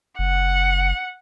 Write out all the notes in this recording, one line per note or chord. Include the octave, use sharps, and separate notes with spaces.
F#1 F#5